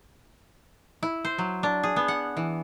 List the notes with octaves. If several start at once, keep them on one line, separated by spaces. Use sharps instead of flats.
E4
C5
F#3
D4
G#4
B3
F#5
E3